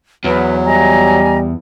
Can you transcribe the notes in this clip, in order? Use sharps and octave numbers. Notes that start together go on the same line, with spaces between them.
E2 F#3 B4
G3 D#5 G#5 A#5